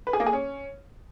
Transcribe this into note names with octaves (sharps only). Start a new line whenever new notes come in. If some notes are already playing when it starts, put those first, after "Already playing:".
B4
G#4
A#3
G#4
C#4